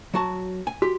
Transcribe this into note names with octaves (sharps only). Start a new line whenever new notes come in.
F#3 F#4 A5
G#5
F#4 G4